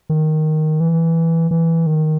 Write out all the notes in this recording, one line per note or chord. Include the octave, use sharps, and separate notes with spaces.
D#3
E3
E3
D#3